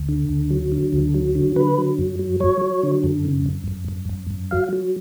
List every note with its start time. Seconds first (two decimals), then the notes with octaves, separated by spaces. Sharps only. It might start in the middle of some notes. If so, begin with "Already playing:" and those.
Already playing: D2
0.09 D3
0.29 D2
0.50 F#3
0.72 D3
0.93 D2
1.14 F#3
1.35 D3
1.56 D3 B4
1.78 F#3
1.99 F#2
2.19 F#3
2.40 F#3 C#5
2.61 F#3
2.83 D3
3.04 F#2
3.25 C#3
3.46 F#2
3.68 F#2
3.88 F#2
4.09 F#2
4.31 F#2
4.51 F#3 F5
4.73 F#3